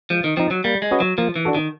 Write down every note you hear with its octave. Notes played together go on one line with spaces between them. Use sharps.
F3 G#3
D#3
F3 C4 D#4
F#3
G3 A#3
G#3
C#4 F#4 B4 D#5
F#3
F3 A#3
E3
D4 F#4 A4
D#3